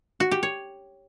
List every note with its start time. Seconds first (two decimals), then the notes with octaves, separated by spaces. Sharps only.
0.20 F#4
0.31 G4
0.43 C#5